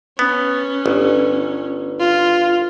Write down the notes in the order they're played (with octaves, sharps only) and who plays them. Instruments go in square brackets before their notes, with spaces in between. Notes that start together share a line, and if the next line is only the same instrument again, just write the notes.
[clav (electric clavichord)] B3 [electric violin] C#4
[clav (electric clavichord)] G1
[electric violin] F4